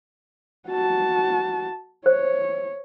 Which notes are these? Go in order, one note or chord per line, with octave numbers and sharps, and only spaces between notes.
F#4 A5
C5 C#5